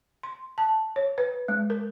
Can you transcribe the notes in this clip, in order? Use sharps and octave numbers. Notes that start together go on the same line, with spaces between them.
C6
A5
C#5
B4
G#3
A#4